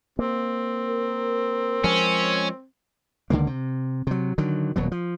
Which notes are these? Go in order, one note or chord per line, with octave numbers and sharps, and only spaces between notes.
A#3 C4
A#4
F3 G#3 C#4
C#2 D3 D#3 A#3
C3
C3 F#3
D3 D#3 F#3
D#1 B2 F#3
F3